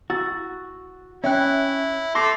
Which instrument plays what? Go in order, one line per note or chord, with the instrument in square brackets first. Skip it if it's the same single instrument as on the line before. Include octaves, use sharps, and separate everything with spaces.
[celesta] E4 E6 A6 [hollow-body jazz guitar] F#4
[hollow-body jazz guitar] C#4 [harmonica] E4 [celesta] E5 G5 F#6
[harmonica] A3 A4 [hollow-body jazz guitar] C6 [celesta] D6 A#6 C7